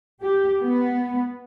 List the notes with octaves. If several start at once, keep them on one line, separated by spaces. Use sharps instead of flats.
G4
B3